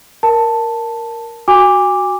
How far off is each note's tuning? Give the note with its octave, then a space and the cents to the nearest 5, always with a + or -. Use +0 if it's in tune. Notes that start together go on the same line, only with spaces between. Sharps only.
A#4 +0 A5 +5
F#4 +0 G#5 -35 D6 +0